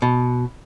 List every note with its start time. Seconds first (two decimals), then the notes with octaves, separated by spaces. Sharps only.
0.02 B2